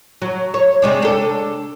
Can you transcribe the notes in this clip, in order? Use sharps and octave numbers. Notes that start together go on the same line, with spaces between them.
F#3
C#5
C3 G#3 D4
D4 A4